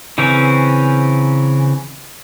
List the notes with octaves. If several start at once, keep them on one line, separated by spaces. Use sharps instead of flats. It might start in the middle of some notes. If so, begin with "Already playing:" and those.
C#3 E3 C4 C#4 A#4